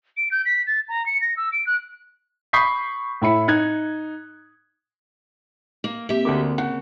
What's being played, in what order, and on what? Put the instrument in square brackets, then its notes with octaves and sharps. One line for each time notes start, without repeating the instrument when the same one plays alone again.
[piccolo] D7
G6
B6
A6
A#5
C#7
A#6
E6
D7
F#6
[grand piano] B5 C#6 D#6 G6 B6 C7
A2 E4 B5 C#7
D#4 F#6 G#6
[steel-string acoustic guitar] A#3
[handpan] A#3 C4 [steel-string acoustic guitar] G4 E5
[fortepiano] D2 D3 D6 [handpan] A#4
[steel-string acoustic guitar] C#3 [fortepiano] F#5